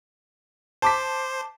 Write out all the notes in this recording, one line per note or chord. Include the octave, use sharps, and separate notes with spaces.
C5 A5 D6 B6